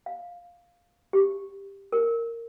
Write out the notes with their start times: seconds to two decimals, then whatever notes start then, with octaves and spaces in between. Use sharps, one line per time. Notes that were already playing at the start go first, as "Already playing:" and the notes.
0.06 F5
1.13 G4
1.93 A#4